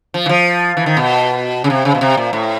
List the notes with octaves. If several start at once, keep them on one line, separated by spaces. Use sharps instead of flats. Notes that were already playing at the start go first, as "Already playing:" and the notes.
F3
E3
F3
E3
D#3
B2
C#3
C3
C#3
B2
C3
A#2
A2